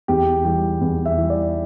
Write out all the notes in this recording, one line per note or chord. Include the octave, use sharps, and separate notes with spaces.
E2 G4
E3 G3 G4
E2
E5
E3 G3
D5